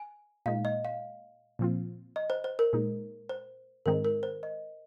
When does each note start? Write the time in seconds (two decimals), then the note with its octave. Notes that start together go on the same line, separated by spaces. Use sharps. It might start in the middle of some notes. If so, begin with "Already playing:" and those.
Already playing: G#5
0.46 A#2 G#3 D#4 F5
0.65 D#5
0.85 F5
1.59 A#2 F3 C4 F4
2.16 D#5
2.30 C5
2.44 C5
2.59 A#4
2.73 A#2 G#3 D#4
3.29 C5
3.86 G#2 D#3 G#3 C4 D#4 A#4
4.05 A#4
4.23 C5
4.43 D#5